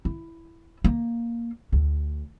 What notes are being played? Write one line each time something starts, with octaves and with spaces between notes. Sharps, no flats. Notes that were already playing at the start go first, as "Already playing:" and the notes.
E4
A#3
D2